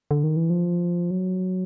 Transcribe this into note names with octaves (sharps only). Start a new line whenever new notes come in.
D3
D#3
E3
F3
F#3